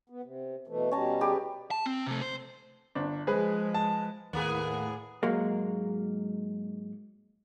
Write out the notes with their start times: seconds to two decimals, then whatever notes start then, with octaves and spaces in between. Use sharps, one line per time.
0.09 B3
0.23 C3
0.67 B2 E3 A3
0.91 B2 G3 C#4 A5 A#5
1.21 G4 G#4 B4
1.71 A5
1.86 C4
2.07 C3 A3
2.22 C5
2.95 G1 D4
3.27 F3 G#3 G#4 B4
3.74 A5
4.33 D#2 A2 A#3 B3 G#4
5.23 G#2 F#3 G#3 A#3